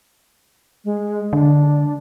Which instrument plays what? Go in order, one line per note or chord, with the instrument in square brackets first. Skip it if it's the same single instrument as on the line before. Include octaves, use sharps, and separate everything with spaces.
[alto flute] G#3
[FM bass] D3 [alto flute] D4